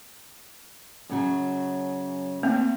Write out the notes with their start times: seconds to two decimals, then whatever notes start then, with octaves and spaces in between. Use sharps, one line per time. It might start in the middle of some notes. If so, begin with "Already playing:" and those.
1.09 F#2 C#3 F#3
2.43 A3 A#3 C4